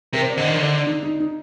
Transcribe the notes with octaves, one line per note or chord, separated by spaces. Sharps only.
C3 A#4
C5
D5
D3 D#5
D#3
D3 D5
D#4
D#4
D#4